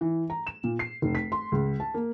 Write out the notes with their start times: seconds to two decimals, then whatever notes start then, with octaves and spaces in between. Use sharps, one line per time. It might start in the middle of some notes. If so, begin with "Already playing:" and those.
0.01 E3
0.30 A#5
0.47 E7
0.64 A#2
0.79 C7
1.02 F1
1.15 B6
1.32 C6
1.52 C#2
1.80 A5
1.94 A#3